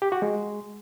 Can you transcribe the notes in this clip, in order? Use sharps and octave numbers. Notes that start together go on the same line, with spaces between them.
G4
F#4
G#3